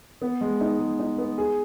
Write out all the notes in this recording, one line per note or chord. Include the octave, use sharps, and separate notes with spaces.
B3
G#3
D#4
G#3
D#4
B3
G#4